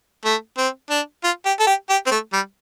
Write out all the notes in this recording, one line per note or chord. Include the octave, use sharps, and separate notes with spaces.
A3
C4
D4
F4
G4
A4
G4
G4
C4
A3
G3